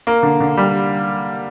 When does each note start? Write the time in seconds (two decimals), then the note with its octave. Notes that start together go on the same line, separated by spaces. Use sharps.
0.07 A#3
0.23 D3
0.40 D3
0.57 G3